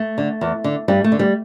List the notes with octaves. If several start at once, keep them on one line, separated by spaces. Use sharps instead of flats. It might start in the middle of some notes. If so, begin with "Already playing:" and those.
Already playing: A3
D3
E2
D3
G2 G3
A3
D3
G3